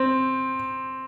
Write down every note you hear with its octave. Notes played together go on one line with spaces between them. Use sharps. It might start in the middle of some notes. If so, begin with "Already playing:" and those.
Already playing: C4